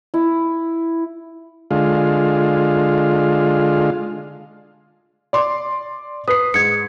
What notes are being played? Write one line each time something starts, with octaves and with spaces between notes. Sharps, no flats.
E4
D3 G#3 F4
D5 C6 D6
B4 D#6 C7
G#2 G#6 C#7